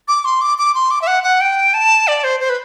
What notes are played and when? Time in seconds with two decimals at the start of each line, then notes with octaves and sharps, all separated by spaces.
0.08 D6
0.25 C6
0.41 D6
0.58 D6
0.75 C6
0.91 D6
1.02 E5
1.07 F#5
1.24 F#5
1.41 G5
1.74 A5
2.08 D5
2.24 C5
2.40 C5
2.50 B4